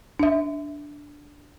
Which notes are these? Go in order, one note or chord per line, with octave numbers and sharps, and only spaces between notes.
D4 E5